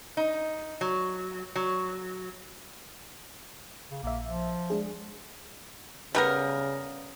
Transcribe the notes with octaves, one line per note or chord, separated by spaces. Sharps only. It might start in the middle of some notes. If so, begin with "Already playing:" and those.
D#4
F#3
F#3
C#3
A#1 A#3 E5
F3
G#3 D4 G#4
C#3 G3 B3 A#4